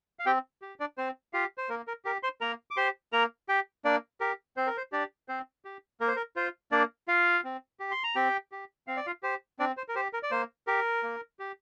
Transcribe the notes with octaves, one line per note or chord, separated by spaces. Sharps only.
F5
C4 G4 G5
G4
D4 D5
C4 C5
F4 G4 F5
C5
A#3 A#4
A#4
G4 A#4
C5 C6
A#3 A#4 A#5
D6
G4 C5 C6
A#3 A#4 A#5
G4 G5
A#3 D4 D5
G4 A#4
C4 C5
A#4
C5
D4 G4 D5
C4 C5
G4
A#3 A#4
C5
A#4
F4 C5
A#3 D4 D5
F4 F5
C4
G4
C6
A#5
C4 G4 G5
G4
C4 F5
D5
F4 F5
G4 C5
C4 D4 D5
C5
A#4
G4 C5
A#4
D5
A#3 C5
G4 A#4
A#3
G4